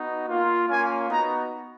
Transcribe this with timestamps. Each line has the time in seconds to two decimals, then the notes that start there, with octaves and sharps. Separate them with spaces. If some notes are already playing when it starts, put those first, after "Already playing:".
Already playing: B3 D#4 F#4
0.27 A#3 F4
0.68 A#3 C#4 F4 G#5
1.09 B3 D#4 F#4 A#5